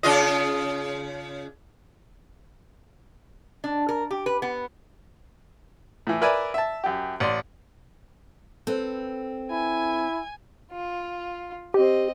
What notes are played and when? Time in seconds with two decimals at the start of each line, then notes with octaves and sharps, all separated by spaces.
0.03 C#3 F4 D#5
3.64 D4
3.89 A#4
4.11 G4
4.26 B4
4.42 B3
6.07 A2 E3
6.22 A#4 B4 D5 E5 G#5
6.54 E5 A5
6.84 F#2 G4
7.20 A1 D5 C6
8.67 C4 A4 B4 C5
9.51 E4 G#5
10.71 F4
11.74 C4 G4 D#5